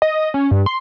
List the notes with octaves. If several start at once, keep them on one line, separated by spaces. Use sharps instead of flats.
D#5
C#4
G2
C6